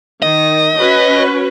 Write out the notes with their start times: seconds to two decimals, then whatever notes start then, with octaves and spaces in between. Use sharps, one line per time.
0.22 D#3 D#5
0.77 C#4 F#4 B4